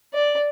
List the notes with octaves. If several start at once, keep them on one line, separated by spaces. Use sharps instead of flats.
D5